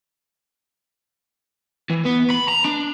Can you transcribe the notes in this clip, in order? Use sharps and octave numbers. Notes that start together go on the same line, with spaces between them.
E3
B3
B5
A#5
D4